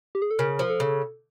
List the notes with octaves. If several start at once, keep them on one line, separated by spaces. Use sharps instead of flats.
G4
G#4
A4
C#3 A#4
F3
A4
C#3